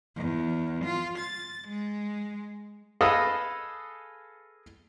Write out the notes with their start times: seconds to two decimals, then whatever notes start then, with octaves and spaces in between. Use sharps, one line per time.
0.17 E2
0.85 F4
1.18 A6
1.69 G#3
3.01 G#4 A4 B4 D#5 F5